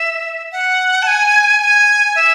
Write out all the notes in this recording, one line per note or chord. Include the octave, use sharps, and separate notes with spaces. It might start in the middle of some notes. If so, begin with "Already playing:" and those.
Already playing: E5
F#5
A5
G#5
G#5
E5